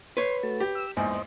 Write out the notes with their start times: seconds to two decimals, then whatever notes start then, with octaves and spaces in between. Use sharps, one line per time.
0.17 B4 C#5 C6
0.43 A3 F#4 A5
0.60 G4
0.75 E6
0.97 A#1 E2 G#2 C5 D#5